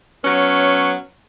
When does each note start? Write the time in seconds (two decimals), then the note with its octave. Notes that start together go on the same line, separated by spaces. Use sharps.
0.24 F#3 B3 C#4